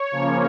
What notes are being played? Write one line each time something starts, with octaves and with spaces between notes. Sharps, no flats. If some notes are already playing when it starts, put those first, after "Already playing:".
Already playing: C#5
C#3 F3 A#3 C#4